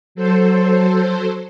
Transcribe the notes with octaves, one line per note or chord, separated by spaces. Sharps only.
F#3 A4 C5